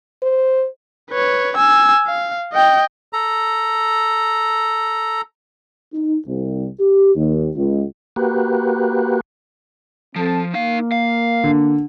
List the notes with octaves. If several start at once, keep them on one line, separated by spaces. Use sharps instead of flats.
C5
B4 C#5
G#5 E6
F5
D#5 G5
A4 A#5
D#4
C2
G4
D#2
C#2
A#3 F#4 G4 B4
F3 C4 A4 A5
A#3 D#4 F5
F5
D3